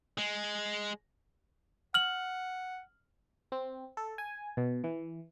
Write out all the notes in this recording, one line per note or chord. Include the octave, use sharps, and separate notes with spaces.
G#3
F#5 F6 F#7
C4
A4
G#5
B2
E3